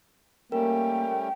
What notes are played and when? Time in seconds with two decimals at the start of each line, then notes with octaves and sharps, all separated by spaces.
0.52 G3 A3 A#3 C#4 A#4 G5